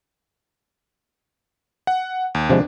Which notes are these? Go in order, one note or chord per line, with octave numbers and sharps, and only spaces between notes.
F#5
D#2
C3 F3 G#3 D4